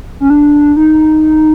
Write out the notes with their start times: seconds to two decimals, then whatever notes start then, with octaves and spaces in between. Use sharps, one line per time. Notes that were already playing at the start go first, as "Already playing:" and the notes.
0.20 C#4
0.30 D4
0.77 D#4